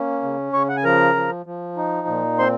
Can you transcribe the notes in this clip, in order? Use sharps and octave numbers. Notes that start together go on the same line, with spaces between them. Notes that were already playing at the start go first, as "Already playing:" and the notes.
Already playing: A#3 C#4
C#3
C#3 C#5 C#6
F#5
G#5
F3 A#4 A#5
F3
F3
D#4
A#2
C4 C5 C6